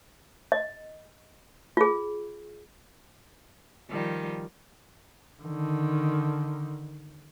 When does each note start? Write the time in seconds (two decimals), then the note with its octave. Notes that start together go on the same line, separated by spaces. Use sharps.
0.52 D#5
1.77 F4 G#4
3.90 D#3 F3 G3
5.43 D3 D#3